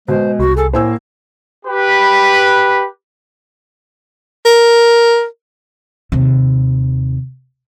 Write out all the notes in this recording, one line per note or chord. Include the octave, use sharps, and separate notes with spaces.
B2 G#3 C5
C2 F#4
G#4 A4
A2 A#3 C5 G#5 E6
G4 B4
A#4
D#2 C3